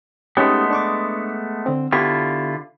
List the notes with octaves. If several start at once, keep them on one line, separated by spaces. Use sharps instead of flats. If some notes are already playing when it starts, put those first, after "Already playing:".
G#3 A3 B3 C#4 D#4 G4
D4 C#6 D6
D3 C4
D3 B3 E4 F4 G4 C#6